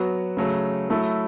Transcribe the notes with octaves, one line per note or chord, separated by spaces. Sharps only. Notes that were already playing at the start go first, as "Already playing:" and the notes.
Already playing: F#3 B3 F#4
C#3 F#3 A3
F#3 A3 E4